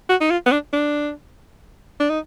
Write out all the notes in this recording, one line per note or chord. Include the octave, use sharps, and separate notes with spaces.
F#4
D#4
F4
B3
D4
D4
D4
D#4